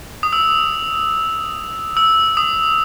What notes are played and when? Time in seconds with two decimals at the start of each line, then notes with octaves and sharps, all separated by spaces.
0.23 D#6
0.33 E6
1.97 E6
2.37 D#6